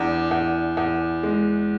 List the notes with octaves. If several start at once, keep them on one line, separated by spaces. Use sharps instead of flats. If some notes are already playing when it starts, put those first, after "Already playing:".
Already playing: E2 D4
E2
E2
G#3